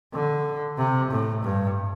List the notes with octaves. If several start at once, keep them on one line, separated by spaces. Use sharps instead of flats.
D3
C3
A2
G2